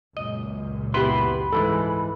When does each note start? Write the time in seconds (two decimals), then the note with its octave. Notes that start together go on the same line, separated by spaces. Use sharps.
0.17 C#2 F#2 A#2 D#5
0.94 B3 E4 G4 B4 B5 C6
1.53 G#2 E3 G#3 A4